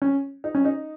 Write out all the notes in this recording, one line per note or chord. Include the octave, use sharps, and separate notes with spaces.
C#4
D#4
C#4
D#4